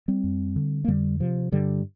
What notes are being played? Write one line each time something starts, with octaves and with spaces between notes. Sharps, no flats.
G3 C4
F2
D3
A#3
F2 D3 G3
C3 F3
G2 D3 G3